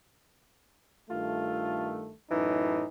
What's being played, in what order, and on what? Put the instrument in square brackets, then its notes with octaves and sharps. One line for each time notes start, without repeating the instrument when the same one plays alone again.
[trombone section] G2 D#3 A3 [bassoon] F4
[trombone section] F#2 A2 D#4 [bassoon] E3